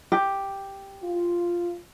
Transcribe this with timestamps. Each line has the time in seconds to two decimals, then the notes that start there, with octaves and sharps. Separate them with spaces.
0.12 G4
1.04 F4